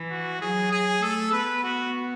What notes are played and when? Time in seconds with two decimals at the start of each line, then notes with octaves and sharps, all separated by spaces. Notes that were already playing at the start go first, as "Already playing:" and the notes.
Already playing: E3
0.11 F#4
0.42 F#3 G#4
0.72 G#4
1.02 A3 A4
1.32 B3 B4
1.64 F#4